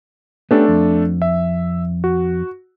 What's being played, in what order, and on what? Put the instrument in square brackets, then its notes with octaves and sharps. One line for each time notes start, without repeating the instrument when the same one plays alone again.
[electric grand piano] A3 D4 A4 [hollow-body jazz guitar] B3 C#4 G4
[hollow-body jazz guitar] F2
[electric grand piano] E5
F#4